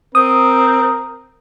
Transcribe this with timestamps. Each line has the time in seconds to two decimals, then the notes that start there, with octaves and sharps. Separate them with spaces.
0.15 C4 A#4 D#6